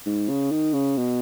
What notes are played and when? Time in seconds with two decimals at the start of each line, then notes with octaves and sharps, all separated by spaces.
0.06 G#2
0.29 C#3
0.51 D#3
0.74 C#3
0.97 B2